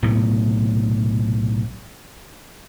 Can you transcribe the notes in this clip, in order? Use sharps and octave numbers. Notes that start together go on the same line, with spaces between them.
B1 A2 C3 A3